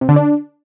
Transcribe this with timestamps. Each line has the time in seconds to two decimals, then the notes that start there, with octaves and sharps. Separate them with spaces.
0.01 C3
0.09 D3
0.16 D4